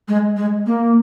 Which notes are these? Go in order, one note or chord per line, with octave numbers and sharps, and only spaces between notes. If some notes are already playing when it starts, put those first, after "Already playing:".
G#3
G#3
A#3